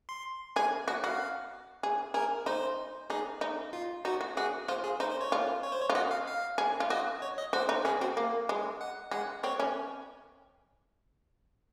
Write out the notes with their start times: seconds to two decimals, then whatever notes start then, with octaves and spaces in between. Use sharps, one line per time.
0.09 C6
0.56 G#4 G#5
0.88 F#4 F#5
1.04 F#4 F5
1.83 G#4
2.14 G#4 A#4
2.46 D#4 C5
3.10 D#4 G#4
3.41 D#4
3.73 F4
4.05 D#4 F#4
4.21 F#4
4.37 F#4 G#4
4.68 F4 C5
4.84 G#4
5.00 D#4 C5
5.11 C5
5.21 C#5
5.32 F4
5.63 C#5
5.72 C5
5.81 C#5
5.90 F4
5.95 F#4 D#5
6.11 F5
6.27 F5
6.58 G#4
6.80 F4
6.90 F#4 D#5
7.22 C#5
7.38 D#5
7.53 F#4 C5
7.69 D#4
7.85 C#4 G#4
8.01 C4 F#4
8.17 A#3
8.49 G#3
8.81 F#5
9.11 G#3 F#5
9.43 C4 C#5
9.60 C#4